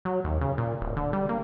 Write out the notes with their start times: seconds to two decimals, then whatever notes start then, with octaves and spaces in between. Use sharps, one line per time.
0.05 F#3
0.24 D#2
0.41 C#3
0.58 A#2
0.81 D1
0.96 D3
1.13 G3
1.29 A#3